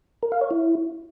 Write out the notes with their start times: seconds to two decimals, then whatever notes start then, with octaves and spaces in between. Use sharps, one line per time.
0.23 A#4
0.32 F5
0.41 C#5
0.51 E4